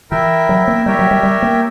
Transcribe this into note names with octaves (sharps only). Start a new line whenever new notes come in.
E3 E4 A#4 E5 G5
F#3
A#3
G3 G4 A#4 C#5 E5 G5
F#3
G3
G3
A#3